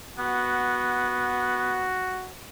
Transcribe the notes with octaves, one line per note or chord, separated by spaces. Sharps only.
B3 F#4